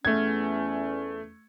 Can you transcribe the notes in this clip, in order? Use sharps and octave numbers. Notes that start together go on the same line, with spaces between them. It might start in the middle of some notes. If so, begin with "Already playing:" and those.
E2 A3 C#4 G#6